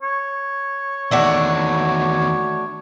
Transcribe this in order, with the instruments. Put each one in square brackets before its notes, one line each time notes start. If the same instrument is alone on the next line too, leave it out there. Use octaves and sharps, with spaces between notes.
[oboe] C#5
[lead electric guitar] E2 D#3 [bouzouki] A3 D4 F#4